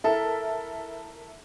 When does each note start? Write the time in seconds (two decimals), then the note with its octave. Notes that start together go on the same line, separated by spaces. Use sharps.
0.04 E4 A4 A#4 E5